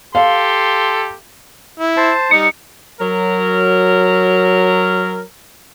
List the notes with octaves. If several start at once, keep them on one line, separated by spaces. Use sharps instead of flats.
G4 A4 F5 C6
E4
C5 A5
G3 D#4 C#7
F#3 A#4